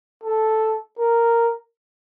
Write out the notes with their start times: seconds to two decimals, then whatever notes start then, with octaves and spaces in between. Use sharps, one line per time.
0.24 A4
0.99 A#4